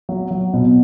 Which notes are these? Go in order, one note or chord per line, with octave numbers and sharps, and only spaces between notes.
F#3
F#3
B2